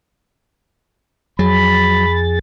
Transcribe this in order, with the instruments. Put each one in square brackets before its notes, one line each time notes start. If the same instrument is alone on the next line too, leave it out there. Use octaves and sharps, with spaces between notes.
[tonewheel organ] F2 G#4 A6 [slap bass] F#3 [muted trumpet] B5